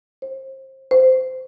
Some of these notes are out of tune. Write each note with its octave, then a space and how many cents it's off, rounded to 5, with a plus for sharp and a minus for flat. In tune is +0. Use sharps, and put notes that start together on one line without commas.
C5 +30
C5 -20